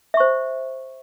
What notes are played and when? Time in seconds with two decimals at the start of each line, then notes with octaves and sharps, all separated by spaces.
0.14 E5
0.17 C#6
0.20 C5